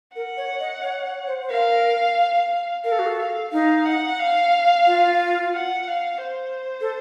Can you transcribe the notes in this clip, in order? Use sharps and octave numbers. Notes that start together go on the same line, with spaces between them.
A#4 F#5
C#5
D#5
C#5
C#5
C5
C5
A#4 F5
A#4 F5
A4
F#4
A4
F5
D#4 F5
F#5
F5
F4
F#5
F5
C5
A4